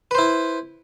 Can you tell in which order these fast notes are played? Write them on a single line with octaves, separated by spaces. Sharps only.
B4 C5 E4